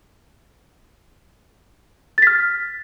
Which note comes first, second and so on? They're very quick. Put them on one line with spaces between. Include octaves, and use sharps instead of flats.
A6 B6 F6